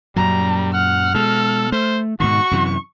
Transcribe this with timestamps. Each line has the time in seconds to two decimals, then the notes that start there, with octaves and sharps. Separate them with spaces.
0.16 F#2 A#2 F#3 G3 A#5
0.73 F#5 F6
1.14 B2 G#3 A4
1.72 A3 C5
2.20 G#2 B2 D#3 F#4 C#6
2.51 F#2 C3 E3